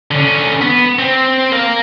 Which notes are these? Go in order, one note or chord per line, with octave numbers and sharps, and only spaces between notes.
D3 C#4
B3
C4
A#4 F5